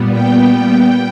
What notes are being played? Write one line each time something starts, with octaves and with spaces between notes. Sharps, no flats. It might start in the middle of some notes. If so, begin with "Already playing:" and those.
Already playing: A#2 G3 B3
G5